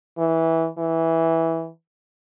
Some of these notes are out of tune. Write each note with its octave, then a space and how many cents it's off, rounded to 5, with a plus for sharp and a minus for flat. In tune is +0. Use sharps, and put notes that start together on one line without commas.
E3 -15
E3 -10